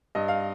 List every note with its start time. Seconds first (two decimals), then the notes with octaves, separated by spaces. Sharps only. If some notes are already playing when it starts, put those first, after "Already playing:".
0.15 G2 D#5
0.28 F5